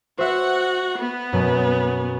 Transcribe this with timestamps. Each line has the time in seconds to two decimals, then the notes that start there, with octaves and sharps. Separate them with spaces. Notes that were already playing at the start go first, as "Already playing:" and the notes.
0.19 F#4 C5 E5 F#5
0.98 B3
1.33 F#2 B2